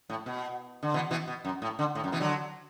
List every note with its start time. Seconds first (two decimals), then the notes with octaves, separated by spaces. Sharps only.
0.10 A2
0.26 B2
0.83 D3
0.94 B2 E3
1.11 B2 E3
1.28 B2
1.45 F#2
1.62 A2
1.79 D3
1.95 A2
2.04 F#2
2.12 B2 E3
2.20 D3 F#3